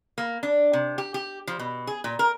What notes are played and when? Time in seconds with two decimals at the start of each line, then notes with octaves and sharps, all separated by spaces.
0.18 A#3
0.43 D4
0.73 C3
0.98 G4
1.14 G4
1.47 F3
1.59 B2
1.87 G#4
2.04 A#2
2.19 A#4